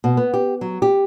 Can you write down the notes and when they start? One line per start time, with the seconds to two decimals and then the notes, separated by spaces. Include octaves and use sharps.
0.04 B2
0.17 B3
0.34 G4
0.61 F#3
0.82 G4